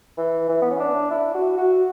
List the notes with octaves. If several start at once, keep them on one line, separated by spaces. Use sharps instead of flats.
E3
E3
B3
C#4
D4
E4
F#4
F#4